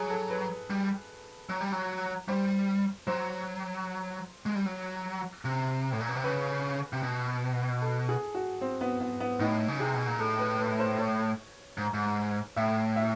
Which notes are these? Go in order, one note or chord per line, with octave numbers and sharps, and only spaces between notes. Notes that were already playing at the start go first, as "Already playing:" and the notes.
Already playing: F#3 G#4
A4
B4
G3
F#3
G3
F#3
G3 C5
F#3 C5
G#3
G3
F#3
C3
A2
A#2
B2
C3
C#3 B4
C3
B2
A4
G#4
F#4
C4
B3
B3
B3
A2 D#4
C#3
C3 G#4
B2
A#2
A2 A4
B4
B4
C5
C#5
G#2
G#2
A2 E5
E5